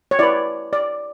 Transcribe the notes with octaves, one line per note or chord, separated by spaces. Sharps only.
C#5
E4 B4 D5
D5